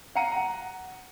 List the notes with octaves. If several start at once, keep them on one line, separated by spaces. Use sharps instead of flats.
F5 F#5 A#5 C#7 D#7
F#5 A#5